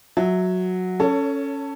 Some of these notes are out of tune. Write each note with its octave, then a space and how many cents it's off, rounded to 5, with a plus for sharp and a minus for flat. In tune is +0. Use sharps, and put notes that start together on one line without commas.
F#3 -10 E5 -15
C#4 +0 A4 +15 C#5 +25